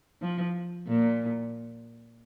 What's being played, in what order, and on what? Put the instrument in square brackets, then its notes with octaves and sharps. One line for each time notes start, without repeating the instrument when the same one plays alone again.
[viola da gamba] F3
A#2